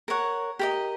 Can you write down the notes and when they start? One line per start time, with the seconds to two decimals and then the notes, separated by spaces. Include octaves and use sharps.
0.08 A#4 C#5 F#5
0.59 G4 A#4 D#5